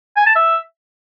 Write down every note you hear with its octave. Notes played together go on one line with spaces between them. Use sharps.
G#5
A5
E5